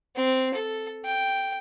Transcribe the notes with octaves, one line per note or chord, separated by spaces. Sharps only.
C4
A4
G5